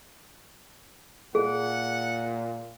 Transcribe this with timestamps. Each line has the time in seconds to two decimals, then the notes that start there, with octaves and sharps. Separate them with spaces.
1.35 A#2 G#4 F#5